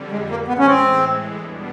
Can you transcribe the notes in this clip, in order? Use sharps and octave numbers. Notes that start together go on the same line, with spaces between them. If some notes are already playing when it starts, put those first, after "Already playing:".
Already playing: F2 D3 G3
G#3
A2 E3 G#3 A#3
B3
C#4
C4
E2 B2 G3 B3 D4